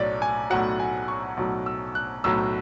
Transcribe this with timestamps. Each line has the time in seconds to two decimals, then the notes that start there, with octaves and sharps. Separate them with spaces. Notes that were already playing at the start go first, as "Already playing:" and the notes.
Already playing: B1 A2 F#3 C#5 D5
0.22 G#5
0.50 B1 A2 F#3 F#5
0.80 G#5
1.08 C#6
1.37 B1 A2 F#3
1.66 E6
1.95 F#6
2.24 B1 A2 F#3 E6